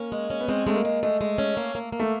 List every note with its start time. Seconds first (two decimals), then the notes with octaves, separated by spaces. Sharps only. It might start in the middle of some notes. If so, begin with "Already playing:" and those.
Already playing: A#3 C#4
0.12 G#3
0.30 C#4
0.40 B3
0.49 G#3 C4
0.67 G#3 A3
0.75 A#3
0.85 G#3
1.03 G#3 A3
1.21 G#3
1.38 C#4
1.57 A#3
1.75 A#3
1.92 A#3
2.00 A3